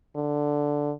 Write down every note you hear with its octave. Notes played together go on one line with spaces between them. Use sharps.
D3